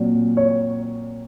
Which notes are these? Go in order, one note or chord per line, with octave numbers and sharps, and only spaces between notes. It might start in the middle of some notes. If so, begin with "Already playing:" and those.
Already playing: A#2 F#3 C4
C#5